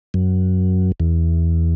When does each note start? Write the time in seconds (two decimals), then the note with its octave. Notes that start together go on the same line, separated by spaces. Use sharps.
0.14 F#2
1.00 E2